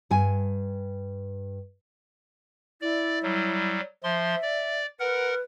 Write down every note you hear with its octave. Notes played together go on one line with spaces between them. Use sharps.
G2 G#5
E4 D5
F#3 G3
F3 E5 C6
D5
A#4 B4 F#5